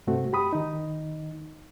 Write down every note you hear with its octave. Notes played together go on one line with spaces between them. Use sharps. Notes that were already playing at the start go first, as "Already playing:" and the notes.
G2 C3 A3 C4 F#4
G4 B5 D#6
D#3 D#4